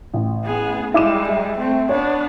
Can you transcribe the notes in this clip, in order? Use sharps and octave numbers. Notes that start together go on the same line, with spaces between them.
A1
B3 G#4
G3 G#3 E4 D6 E7
E5
A3 C4
B3 D4 C#5